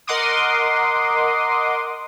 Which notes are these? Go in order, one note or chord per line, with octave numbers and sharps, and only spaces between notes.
A#4 D#5 F#5 C6 D6 D#6